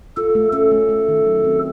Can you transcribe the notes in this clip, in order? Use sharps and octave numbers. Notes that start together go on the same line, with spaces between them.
F4 A4
A3
C#4 A4
A3
A3
D#3
F#3
C4